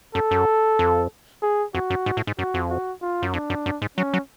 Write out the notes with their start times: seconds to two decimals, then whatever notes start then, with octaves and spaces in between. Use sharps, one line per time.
0.15 F#2 A4
0.31 F#2
0.79 F2
1.42 G#4
1.74 F2 F#4
1.90 F#2
2.06 G#2
2.17 A2
2.27 G#2
2.38 F#2 F#4
2.54 F2
2.70 F#4
3.02 F4
3.23 F#2
3.33 F2 D4
3.50 F#2
3.66 F#2
3.82 G#2
3.97 F#3 C#4
4.14 F#3